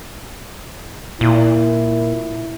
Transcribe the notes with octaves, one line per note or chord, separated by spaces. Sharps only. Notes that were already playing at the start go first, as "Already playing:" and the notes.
A#2 E4